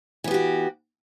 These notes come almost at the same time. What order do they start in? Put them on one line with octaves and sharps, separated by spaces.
E3 B3 G4 F#4